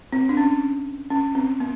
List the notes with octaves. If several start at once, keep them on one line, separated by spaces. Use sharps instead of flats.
C4
D4
C#4
C#4
C4
B3